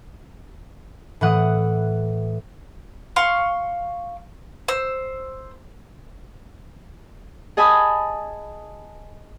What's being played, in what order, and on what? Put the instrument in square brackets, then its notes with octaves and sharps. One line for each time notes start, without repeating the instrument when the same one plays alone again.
[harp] A2 E3 F#5 D#6
[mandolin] F5 C6 C#6
C5 E6
[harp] G#4 D#5 G#5 A5 B5 D#6